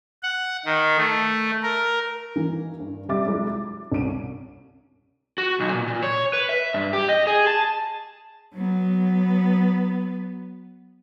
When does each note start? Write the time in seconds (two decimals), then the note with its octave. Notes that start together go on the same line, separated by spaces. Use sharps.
0.23 F#5
0.65 D#3
0.98 A3
1.63 A#4
2.36 D#3 E3 A#3
2.80 G2
3.09 C3 G3 E5 D6 A6
3.26 F#3 G#3 E4
3.47 A6
3.92 C2 C#4 D7 D#7
5.38 F#4
5.60 B1
5.71 A#2
5.87 A#2
6.03 C#5
6.33 B4
6.49 E5
6.74 G2
6.93 G4
7.09 D#5
7.27 G#4
7.47 A5
8.55 F#3 B3